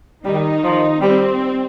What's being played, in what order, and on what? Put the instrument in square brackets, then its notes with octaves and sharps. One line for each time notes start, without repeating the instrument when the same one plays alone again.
[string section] D#3 D#4 [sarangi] G3
[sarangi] F3
[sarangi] G3 [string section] C4